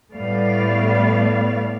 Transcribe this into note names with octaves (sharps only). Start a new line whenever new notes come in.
A2 G3 A3 B3 D5 F5